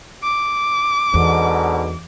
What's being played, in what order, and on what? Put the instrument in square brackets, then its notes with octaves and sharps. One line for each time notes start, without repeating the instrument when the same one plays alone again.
[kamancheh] D6
[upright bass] E2 [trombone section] G#2 B2 D3